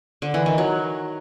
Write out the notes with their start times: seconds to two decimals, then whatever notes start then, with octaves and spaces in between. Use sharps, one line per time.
0.22 D3
0.34 E3
0.46 D#3
0.58 F#3